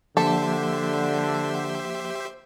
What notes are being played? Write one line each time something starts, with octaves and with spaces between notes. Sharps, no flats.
D3 F3 A#3 G4 A4 C5 E5